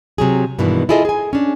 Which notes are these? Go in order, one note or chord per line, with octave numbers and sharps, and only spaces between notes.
C3 F#3 G#4
G2 B2 D#3 E3 G#3
E4 F4 G#4 A4 D#5
G#4 G#5
C#4 D4